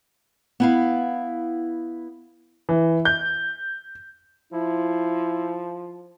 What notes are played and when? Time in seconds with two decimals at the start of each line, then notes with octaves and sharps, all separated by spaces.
0.60 B3 E4 F5
2.69 E3
3.05 G6
4.53 F3 E4